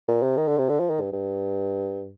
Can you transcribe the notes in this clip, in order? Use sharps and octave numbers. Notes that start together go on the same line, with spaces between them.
A#2
C3
D#3
D3
C3
D3
F3
D#3
G2
G2